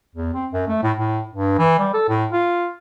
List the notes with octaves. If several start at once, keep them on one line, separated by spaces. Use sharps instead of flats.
E2
C4
F#2
A3
A2
A2
G2
E3
G3
A4
A2
F4